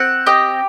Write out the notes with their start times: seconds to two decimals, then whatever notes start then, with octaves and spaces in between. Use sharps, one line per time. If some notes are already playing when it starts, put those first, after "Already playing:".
Already playing: C4 F#5
0.26 G4 D#5